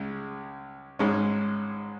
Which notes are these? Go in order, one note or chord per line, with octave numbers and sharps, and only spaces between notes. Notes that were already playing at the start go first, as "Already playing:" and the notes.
Already playing: C#2 C#3 G#3
G#1 G#2 G#3 C#4